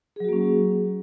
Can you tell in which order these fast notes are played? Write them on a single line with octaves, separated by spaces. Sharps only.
G#4 F#3 F#4 A#3 C#4